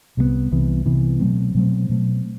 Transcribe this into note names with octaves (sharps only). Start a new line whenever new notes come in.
C2 C3 E3 B3
C2 C3 E3 B3
C2 C3 E3 B3
B2 F#3 A3 C4
B2 F#3 A3 C4
B2 F#3 A3 C4